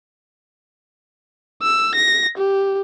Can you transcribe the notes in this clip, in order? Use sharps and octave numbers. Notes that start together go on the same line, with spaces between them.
E6
A#6
G4